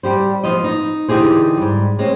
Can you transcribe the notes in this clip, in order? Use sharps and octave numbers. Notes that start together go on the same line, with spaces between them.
G3 G4 C5
F3 B3 C5 D#5
D#4
D3 E3 D#4 G4 G#4 C5
G#2 G3
G#3 C4 C#4